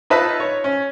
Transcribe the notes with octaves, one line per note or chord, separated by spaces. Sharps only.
D#4 F4 B4 D#5 E5 A5
C#5
C#4